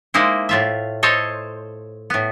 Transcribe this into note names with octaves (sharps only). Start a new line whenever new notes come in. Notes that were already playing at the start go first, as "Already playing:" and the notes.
G#3 A#3 D#4 E4 C5
A2 F4 E5
A4 C5 C#5 D#5
A2 B3